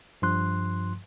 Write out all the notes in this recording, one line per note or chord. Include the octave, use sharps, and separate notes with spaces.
G2 F3 C6 F#6